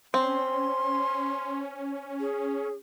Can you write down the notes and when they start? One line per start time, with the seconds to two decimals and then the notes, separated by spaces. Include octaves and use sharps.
0.14 C4 C#4 C6
2.20 G#4